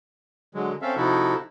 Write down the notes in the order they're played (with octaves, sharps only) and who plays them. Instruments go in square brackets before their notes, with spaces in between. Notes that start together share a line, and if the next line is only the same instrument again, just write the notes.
[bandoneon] D3 F#3 G#3
C4 C#4 A4 E5 F5
C3 F3 D#4 E4 F#4 A4